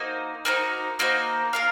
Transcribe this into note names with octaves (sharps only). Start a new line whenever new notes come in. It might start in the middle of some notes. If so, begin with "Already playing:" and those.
Already playing: A#3 D#4 F#4 C5
A#3 D#4 F#4 C5
A#3 D#4 F#4 C5
F4 A#4 F5